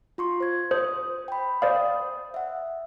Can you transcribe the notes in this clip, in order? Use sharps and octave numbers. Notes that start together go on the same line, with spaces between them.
F4 C6 C#6
C5 G#6
C5 D#6
G5 B5
C5 D5 F5 D#6
E5 F#5